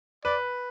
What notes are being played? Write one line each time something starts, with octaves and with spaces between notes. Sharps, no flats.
B4 D5